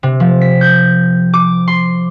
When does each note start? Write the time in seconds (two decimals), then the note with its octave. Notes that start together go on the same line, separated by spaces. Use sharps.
0.03 C3
0.20 F3
0.41 B6
0.61 G6
1.34 D6
1.68 C6